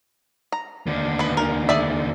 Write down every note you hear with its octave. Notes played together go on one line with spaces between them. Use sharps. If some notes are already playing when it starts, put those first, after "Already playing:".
A#5
D#2 D3
B3 B4
A#4
G#4 D5 E5